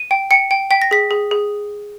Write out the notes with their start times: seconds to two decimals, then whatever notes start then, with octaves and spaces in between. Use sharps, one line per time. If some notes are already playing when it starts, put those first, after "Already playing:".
Already playing: D#7
0.11 G5
0.31 G5 C#7
0.51 G5
0.71 G5 B6
0.82 A#6
0.91 G#4 B6
1.11 G#4
1.31 G#4